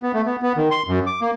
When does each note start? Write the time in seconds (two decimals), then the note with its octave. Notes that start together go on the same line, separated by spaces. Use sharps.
0.03 B3
0.14 A3
0.26 B3
0.42 B3
0.57 D#3
0.71 C6
0.88 F#2
1.07 D6
1.22 A#3